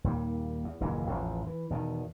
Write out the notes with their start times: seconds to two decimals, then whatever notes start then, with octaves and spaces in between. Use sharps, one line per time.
0.04 D#2 A#2 G3
0.64 E2
0.80 F#1 D#2 A#2 E3
1.10 A1 E2 A2 F3
1.47 E3
1.70 E2 B2 D#3